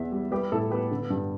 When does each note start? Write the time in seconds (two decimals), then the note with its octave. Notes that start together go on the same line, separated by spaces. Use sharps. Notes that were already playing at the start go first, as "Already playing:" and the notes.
Already playing: E2 E3 E5
0.12 G3
0.32 G3 G4 B4
0.52 A2 E4 A4
0.71 B3 G4 B4
0.91 D3
1.10 G2